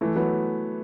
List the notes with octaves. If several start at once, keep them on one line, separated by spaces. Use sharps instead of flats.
E3 A3
F#3 B3